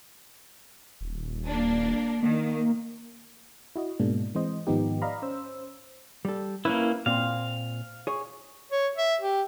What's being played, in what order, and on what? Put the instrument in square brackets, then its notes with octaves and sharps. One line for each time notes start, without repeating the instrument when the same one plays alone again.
[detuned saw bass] D#1
[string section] A#3 D4
[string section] D#3 [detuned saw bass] A#3
[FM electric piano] E4 F#4 D#5
G#2 B2 G#3 A#3 D4
E3 G#3 C4 C5 D#5
G#2 D#3 F3 B3 D#4 G4
D5 D#5 F5 A#5 B5
C#4 C5 E6
[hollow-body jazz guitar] G3 A4
[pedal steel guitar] A#3 C#4 E4 [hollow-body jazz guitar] B4
[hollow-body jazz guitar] A#2 C4 [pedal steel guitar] F5
[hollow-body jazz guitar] G#4 C#5
[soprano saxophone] C#5
E5
G4